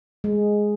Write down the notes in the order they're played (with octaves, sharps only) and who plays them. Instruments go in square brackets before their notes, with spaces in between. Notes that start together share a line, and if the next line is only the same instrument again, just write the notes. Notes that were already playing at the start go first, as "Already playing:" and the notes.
[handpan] G#3